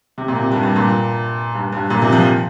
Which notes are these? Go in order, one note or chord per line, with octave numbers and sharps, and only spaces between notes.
C3
A#2
C3
G2
G2
A#2
G2
G2
A#2
C3
F3